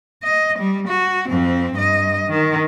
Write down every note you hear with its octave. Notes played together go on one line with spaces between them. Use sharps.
D#5
G3
F#4
F2 C4
G2 D#5
D#3